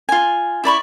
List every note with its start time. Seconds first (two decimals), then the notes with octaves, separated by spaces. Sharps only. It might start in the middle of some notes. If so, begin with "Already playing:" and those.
0.09 F4 G#5
0.64 E4 D5 B5 C#6